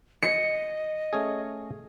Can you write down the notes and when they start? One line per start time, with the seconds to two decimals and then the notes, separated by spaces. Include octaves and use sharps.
0.23 D#5 C#7
1.13 A3 C#4 G#4